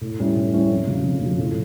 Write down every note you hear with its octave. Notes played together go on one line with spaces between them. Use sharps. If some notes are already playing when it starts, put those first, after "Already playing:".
A2
G3 C#4 E4
A2
G3 C#4 E4
F2
C#3 F3
F2
C#3 F3
A2